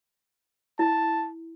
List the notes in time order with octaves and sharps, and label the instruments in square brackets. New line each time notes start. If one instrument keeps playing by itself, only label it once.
[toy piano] E4 [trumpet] A5